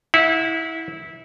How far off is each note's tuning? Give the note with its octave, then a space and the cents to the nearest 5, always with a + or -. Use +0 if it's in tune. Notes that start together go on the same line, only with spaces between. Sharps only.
E4 -20 F#5 -40